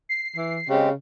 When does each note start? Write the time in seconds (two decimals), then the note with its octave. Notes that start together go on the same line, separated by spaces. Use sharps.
0.09 C7
0.36 E3
0.69 C#3 G#3 C4 G4